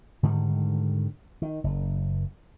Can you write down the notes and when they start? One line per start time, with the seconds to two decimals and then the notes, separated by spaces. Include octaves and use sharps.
0.23 G#2 D3 D#3 G3
1.42 D#3
1.64 F#1